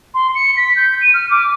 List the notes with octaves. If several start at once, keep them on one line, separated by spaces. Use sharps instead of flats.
C6
C#7
B6
G6
D#7
F6
D6